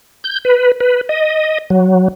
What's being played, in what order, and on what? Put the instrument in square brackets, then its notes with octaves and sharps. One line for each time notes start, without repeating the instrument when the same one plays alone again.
[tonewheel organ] G6
B4
B4
D#5
F#3